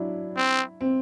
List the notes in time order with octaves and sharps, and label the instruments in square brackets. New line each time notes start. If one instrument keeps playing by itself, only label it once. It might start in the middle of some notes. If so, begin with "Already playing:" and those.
Already playing: [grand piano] F#3 D4 E4
[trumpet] C4
[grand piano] C4